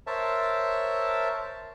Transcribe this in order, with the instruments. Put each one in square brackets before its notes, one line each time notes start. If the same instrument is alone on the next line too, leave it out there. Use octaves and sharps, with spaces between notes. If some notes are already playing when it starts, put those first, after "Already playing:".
[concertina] A#4 C5 C#5 E5 A5